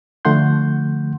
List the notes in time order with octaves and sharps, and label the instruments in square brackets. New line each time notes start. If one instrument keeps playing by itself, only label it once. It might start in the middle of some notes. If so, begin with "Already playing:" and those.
[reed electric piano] D3 F3 A3 F#5 C6 G6